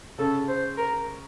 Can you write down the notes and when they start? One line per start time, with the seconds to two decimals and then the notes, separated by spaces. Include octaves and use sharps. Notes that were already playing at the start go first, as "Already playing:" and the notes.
0.18 C#3 C#4 A4
0.48 C5
0.77 A#4